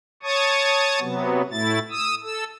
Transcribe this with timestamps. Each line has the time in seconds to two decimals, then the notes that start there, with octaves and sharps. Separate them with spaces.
0.23 C#5 A5 C#6 D#6
1.00 C3 F#3 B3
1.51 A2 A3 E4 A6
1.90 D#6 E6
2.24 A4 E6